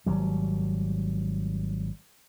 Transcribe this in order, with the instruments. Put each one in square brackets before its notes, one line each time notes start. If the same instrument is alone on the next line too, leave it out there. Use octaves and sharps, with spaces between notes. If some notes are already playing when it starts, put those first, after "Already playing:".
[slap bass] G#1 F#3 G3